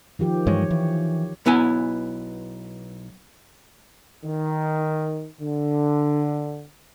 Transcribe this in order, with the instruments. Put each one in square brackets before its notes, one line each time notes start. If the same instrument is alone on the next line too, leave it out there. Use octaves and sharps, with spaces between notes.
[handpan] D#3 F3 G4
[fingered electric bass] G2 E3 G#3 [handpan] C#5
[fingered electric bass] E3
[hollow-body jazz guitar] B1 B3 E4 G#5
[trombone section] D#3
D3